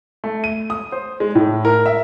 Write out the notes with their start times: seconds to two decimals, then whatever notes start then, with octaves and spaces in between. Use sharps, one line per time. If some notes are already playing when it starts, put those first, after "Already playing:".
0.24 A3
0.44 D#7
0.70 D#6
0.92 C5
1.20 G#3
1.35 A2
1.65 A#4
1.86 E5